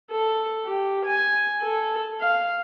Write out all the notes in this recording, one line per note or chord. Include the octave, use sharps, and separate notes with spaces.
A4
G4
G#5
A4
F5